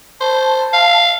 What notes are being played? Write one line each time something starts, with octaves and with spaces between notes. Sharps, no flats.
C5 A5
F5